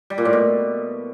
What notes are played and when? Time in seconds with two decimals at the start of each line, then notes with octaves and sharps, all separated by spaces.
0.10 G3
0.18 A#2
0.25 A2
0.33 B2